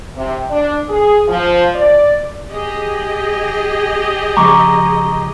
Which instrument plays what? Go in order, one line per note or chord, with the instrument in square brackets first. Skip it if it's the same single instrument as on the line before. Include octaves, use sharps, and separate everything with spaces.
[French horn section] C3
D4
G#4
F3
D5
[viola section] G4 G#4 D#5
[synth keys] C#3 F3 G#3 [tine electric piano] A#5 C#6 [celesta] D6